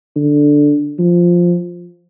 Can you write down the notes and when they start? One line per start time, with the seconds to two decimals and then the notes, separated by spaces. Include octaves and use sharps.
0.16 D3
0.99 F3